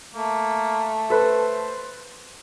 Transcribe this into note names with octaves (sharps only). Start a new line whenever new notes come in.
A3 A#3
A4 B4 C5